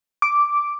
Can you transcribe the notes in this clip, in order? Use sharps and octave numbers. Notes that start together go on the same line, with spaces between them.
D6